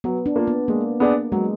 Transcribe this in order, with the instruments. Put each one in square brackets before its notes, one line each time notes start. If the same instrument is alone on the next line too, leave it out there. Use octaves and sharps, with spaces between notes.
[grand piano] F#3 [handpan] B3
[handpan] D4
[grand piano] A#3 F4
[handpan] B3
[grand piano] G#3 [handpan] A#3
[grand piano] B3 D4 G#4 D5
[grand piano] F#3 [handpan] G#3